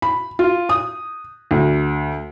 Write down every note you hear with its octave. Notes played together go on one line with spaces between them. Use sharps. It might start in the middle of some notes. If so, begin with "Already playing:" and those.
B5
F4
D#6
D2